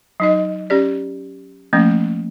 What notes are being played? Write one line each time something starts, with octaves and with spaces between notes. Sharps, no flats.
F#3 D#4 D#5
C#4 G4 D5
F3 A3 A#3 C#4